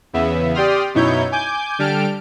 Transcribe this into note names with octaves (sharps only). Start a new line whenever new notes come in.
E2 C#3 B3 E5
G4 D5 G5 C6 D#6 F6
F#2 B2 D#4 E4 C#5 G6
G#5 D6 G6
D3 G3 G5 A5 F6 D7